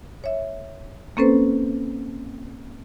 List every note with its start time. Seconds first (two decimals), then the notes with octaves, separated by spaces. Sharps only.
0.24 C#5 E5
1.17 A#3 C4 C#4 A4 B4 C5